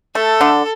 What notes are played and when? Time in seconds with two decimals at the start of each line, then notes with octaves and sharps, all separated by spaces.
0.15 A3 A4
0.41 D3